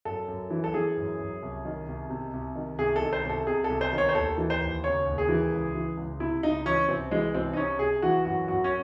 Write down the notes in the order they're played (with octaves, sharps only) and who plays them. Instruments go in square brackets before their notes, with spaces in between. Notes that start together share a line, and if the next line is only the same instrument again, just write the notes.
[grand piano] F#2 A4
F#2
E3
A4
E3 G#4
F#2
F#2
C2
D#3
C2
C3
C2
D#3
C2 G#4
A4
D#3
C5
C2
A4
C3 G#4
A4
C2
C5
D#3
C#5
C5
D#2 A4
E3
C5
D#2
C#3 C#5
D#2
G#4
E3
C#2
E3
C#2
C3 E4
C#2 D#4
E3 C#4
C2 C4
E3 G#3
C2 C4
D#4
C3 C#4
C2 G#4
E3 F#4
F#2 F#4
F#2 F#4
C#4